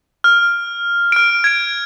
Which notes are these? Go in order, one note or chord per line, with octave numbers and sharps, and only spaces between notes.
F6
F6 D7
G#6 D7